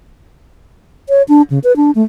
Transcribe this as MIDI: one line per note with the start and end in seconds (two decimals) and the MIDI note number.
1.09 1.22 73
1.29 1.42 62
1.50 1.59 49
1.64 1.75 71
1.76 1.91 62
1.95 2.02 57